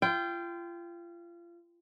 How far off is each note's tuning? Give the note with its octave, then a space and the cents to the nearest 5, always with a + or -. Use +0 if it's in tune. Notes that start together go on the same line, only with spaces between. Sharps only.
F4 -30 G5 +0